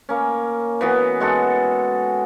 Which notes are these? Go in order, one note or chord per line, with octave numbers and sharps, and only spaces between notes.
A#3 C#4
E3 B3 F#4
G#3 F#4 A4